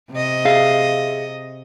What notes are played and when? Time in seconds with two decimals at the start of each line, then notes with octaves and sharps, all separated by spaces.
0.12 C3 D#5
0.45 G#4 E5 F5